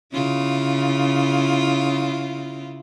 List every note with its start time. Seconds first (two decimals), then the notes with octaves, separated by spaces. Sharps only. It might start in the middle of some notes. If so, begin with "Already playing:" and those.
0.12 C#3 E4 F4